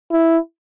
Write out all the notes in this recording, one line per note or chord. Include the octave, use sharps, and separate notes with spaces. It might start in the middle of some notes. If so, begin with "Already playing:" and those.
E4